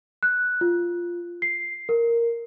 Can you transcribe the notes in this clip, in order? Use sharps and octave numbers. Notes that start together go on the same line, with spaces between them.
F#6
F4
C7
A#4